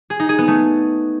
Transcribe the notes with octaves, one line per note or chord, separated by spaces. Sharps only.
G#4
D#4
G#4
B3
A3